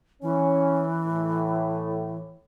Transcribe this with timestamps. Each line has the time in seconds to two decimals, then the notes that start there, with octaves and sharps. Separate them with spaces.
0.22 E3 C#4
1.07 A2